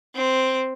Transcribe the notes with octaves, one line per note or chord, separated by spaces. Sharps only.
C4